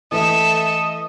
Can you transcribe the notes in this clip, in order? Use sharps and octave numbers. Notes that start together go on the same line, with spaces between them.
E3 A3 A4 D#5 E5